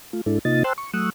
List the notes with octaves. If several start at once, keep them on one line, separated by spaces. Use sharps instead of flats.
A3 F4
G#2 G#3 D4 E4 A4
C3 A#3 D#4 F4 D#5 A6
C5 G5 A5 C6 E6 F#6
C#6
F#3 A3 C#6 D#6 E6 F#6